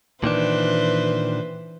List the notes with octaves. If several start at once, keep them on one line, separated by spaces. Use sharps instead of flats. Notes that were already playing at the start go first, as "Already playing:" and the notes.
A#2 D#3 E3 D4 B4 C5